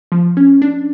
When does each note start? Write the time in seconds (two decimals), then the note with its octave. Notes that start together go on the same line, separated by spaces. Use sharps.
0.12 F3
0.37 C#4
0.62 D4